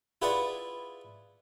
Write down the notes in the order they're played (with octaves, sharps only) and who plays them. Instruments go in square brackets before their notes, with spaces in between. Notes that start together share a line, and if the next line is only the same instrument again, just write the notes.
[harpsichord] E4 F4 G#4 B4 D5 F#5